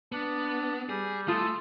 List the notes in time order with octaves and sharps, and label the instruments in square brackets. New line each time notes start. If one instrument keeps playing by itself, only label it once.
[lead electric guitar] B3 [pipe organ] D4
[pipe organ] G3 G4 [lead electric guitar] G#4
[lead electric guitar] A3 [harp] F4 [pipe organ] A5 D#6